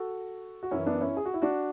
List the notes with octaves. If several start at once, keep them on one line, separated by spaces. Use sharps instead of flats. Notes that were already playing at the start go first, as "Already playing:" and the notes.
Already playing: F#4 A4
F#4
F#2 E3 C#4 E4
B3 D4
C#4 E4
G#4
F#4
E4
D4 F#4